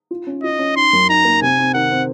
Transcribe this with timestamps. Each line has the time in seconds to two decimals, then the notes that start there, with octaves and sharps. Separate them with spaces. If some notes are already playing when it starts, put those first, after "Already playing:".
0.11 F4
0.27 C#4
0.43 F4 D#5
0.59 C#4
0.76 D#4 C6
0.93 F#2
1.09 D#4 A#5
1.25 A#3
1.42 C3 G#5
1.58 C4
1.74 D#3 F#5
1.91 C4